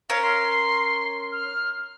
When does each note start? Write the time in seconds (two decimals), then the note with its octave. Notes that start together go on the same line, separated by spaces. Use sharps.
0.10 C#4 A#4 F5
0.22 C6
1.32 F6